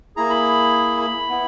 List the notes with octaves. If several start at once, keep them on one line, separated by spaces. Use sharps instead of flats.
A#3 E4 G#4 A#5
B5
B5
B3 E4